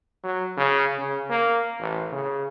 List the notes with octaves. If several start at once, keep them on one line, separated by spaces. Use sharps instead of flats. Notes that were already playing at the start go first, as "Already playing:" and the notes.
F#3
C#3
C#3
A#3
A1
C#3